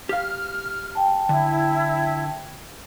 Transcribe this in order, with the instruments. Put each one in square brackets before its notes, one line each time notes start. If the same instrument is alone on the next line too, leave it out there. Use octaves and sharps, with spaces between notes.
[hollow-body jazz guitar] G4 F5 [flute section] F6
[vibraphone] G5 A5
[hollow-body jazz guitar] D3 [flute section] E4